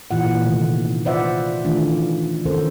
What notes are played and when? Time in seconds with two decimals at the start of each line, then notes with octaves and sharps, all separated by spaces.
0.11 A#2 E3 F4 F#5
0.45 C3 D#3 A3
1.05 F4 B4 C5 D5 E5 F#5
1.65 D#3 E3 A3 D4 F4
2.45 D#3 F3 C#4 A4 A#4 C5